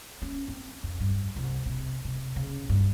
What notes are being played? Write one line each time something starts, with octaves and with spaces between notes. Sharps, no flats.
C#4
C4
F2
G2
C2
C3
C3
C#3
G2